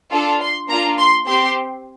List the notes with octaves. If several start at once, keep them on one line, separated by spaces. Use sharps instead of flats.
D4 F4 A4
C6
A#3 D4 F4 A#5
C6
C4 G4 C6